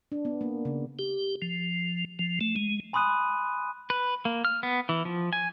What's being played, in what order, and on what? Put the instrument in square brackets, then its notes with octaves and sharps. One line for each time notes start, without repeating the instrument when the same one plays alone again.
[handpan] D4
B3
A#3
C#3
[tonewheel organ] G4
F3
F3
A3
G#3
[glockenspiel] G#5 B5 C6 D#6 F#6 D#7
[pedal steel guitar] B4
A#3
F6
B3
E3
F3
G#5